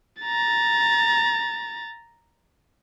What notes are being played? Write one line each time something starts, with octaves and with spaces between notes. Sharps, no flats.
A#5 A6